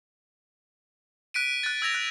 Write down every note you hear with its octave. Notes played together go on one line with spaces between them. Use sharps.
F#6 B6 D7 D#7
F#6 A6
E6 G#6 A#6 F7
F#6